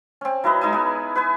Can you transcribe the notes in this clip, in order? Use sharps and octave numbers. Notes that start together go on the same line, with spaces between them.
C4 C#4
F#3 E4 B4 D#5
G#3 D#4 E4 G#5
G#3 B3
B4 E5 G#5